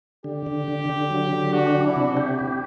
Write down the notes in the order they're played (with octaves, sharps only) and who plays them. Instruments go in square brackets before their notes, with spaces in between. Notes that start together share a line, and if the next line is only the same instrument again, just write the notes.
[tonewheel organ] D3 [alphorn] G4
[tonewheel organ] D3
D3
D3
F#3
D3
[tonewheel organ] D4 [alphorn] F#4
[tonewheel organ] D4
[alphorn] E4
[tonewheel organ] C3
G4
G4